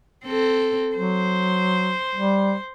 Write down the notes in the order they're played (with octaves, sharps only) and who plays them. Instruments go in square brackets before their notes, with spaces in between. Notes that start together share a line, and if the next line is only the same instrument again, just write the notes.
[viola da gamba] C4 A4
[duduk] F#3 [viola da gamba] C5
[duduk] G3